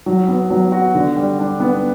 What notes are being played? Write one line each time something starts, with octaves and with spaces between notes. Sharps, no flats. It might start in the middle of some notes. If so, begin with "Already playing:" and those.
F#3
B3
F#3
F#4
D3
G3
D4
B3